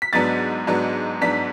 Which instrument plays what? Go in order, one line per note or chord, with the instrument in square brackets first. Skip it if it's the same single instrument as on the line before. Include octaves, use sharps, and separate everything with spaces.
[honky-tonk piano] B6
G#2 F#3 B3 D4 A6
G#2 F#3 B3 D4
G#2 F#3 B3 D4 B6